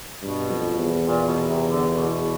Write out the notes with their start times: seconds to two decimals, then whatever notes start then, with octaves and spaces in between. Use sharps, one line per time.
0.21 G2 B2
0.49 F2
0.78 E2
1.06 A#2
1.27 B2
1.48 C3
1.69 D3
1.91 B2